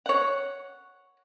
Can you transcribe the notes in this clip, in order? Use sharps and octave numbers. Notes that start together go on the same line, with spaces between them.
C#5 F#5